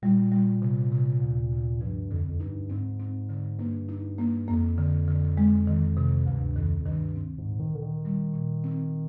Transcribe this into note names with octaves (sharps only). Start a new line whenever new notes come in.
A#2 G3
G3
C3
C3
D2
D2
G2 F3
F2 D3
F2
G2 D#4
G#2 C4
C4
D3
G2 A#3
D#4
A#3
F2 A#3
D3
D3
G#3
D#3
C3
D2 G2
F2 D#3
F2
G2 D#3
C4
G#2
A#2
D#3
A#2 D3
D#3
G3
A#2
C4